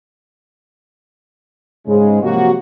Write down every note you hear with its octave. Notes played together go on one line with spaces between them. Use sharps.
G#2 C#3 G#3
C3 F3 F#3 A#3 F#4